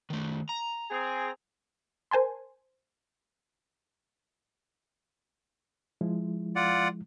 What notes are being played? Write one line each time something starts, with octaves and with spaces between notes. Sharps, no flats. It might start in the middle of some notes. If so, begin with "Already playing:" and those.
D#3 A3
A#5
C4 G#4
A#4 C5 G#5 A5 C6
F3 G#3 E4
F4 D5 F#5